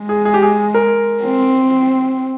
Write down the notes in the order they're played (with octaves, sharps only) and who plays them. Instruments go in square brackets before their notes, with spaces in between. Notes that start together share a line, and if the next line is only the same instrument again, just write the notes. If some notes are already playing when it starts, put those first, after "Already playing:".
Already playing: [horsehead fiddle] G#3
[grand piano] G#4
G#4
G4
G#4
A#4
[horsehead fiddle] C4